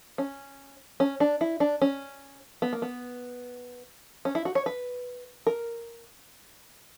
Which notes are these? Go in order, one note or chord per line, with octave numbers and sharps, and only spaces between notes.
C#4
C#4
D4
E4
D4
C#4
B3
A#3
B3
C#4
E4
F#4
C#5
B4
A#4